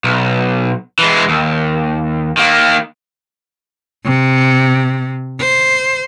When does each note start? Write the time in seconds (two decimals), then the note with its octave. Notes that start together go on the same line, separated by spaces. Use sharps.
0.04 B1
0.99 E3 G#3
1.29 D#2
2.37 D#3 A#3
4.06 C3
5.41 C5